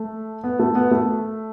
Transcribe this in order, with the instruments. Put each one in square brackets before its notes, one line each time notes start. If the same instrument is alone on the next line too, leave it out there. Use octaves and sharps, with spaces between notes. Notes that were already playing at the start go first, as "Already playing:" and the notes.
Already playing: [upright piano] A3
B3
A3
B3
A3